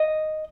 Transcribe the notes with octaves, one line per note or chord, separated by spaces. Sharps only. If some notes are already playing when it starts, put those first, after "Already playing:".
Already playing: D#5